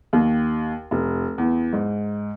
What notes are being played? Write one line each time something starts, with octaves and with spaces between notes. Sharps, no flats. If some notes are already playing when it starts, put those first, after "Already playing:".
D#2
F1
E2
G#2